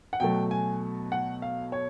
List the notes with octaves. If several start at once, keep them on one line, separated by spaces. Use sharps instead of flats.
F#5
B2 F#3 A3 G5
G#5
F#5
F5
C#5